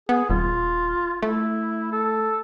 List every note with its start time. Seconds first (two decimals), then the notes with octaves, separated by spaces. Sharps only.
0.09 B3 G#4
0.30 D#1 F4
1.22 A3 E4
1.92 A4